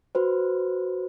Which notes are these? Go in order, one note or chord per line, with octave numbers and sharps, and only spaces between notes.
F#4 B4 C5